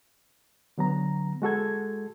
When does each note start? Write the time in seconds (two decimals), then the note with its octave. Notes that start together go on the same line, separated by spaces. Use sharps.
0.78 D3 F#3 B3 A#5
1.42 G#3 F#4 A4 G#6